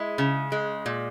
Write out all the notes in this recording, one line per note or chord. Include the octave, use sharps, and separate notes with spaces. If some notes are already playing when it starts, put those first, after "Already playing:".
Already playing: G#3 E4
C#3
G#3
A#2